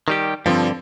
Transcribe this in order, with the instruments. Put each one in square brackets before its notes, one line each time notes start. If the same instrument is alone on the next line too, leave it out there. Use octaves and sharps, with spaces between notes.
[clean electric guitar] D#3 G3 G4
[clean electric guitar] G2 D3 [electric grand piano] F3 C4